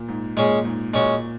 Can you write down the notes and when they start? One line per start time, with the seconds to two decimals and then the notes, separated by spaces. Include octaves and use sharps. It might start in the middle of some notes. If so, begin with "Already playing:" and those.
Already playing: A#2
0.08 G#2
0.37 A#2 G#3 C#4 G#4
0.65 G#2
0.93 A#2 G#3 C#4 F#4